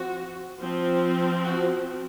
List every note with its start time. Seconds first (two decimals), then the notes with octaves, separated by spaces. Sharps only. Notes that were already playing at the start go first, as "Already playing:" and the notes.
Already playing: F3 C4 F#4
0.60 F3 C4
1.44 F#4